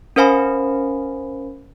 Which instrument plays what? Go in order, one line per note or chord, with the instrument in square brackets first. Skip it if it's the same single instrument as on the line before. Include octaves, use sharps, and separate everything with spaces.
[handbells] C#4 A#4 C5 F5 G#5 B5